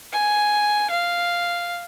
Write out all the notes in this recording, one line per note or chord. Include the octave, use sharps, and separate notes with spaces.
G#5
F5